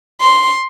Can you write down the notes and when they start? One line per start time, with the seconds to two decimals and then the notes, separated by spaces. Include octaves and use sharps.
0.21 C6